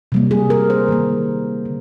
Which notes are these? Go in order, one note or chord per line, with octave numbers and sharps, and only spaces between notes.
C3 G3 A#3
G#4
A#4
C5
D#3 G3 A#3
D3